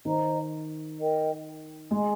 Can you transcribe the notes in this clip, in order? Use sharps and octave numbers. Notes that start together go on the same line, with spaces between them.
D#3 C5 D#5 A#5
A#4 D#5 G5
G#3 G#4 D#5 G#5 C6